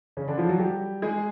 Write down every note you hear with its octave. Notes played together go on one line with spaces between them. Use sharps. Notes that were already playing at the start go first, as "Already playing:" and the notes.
C#3 C#4
D3 D4
F3 F4
F#3 F#4
G3 G4
G#3 G#4